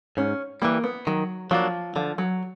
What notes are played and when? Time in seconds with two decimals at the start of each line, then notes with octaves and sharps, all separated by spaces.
0.17 G#2 C#4
0.62 E3 G3 A#3
0.84 B3
1.07 D#3 F#3
1.51 F3 F#3 A#3 D4
1.96 D3 F3
2.18 F#3